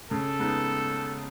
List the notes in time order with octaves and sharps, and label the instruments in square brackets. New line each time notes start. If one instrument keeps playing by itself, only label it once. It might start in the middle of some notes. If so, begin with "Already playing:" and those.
[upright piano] C#3 [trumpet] A4
[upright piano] G#3 B3 D#4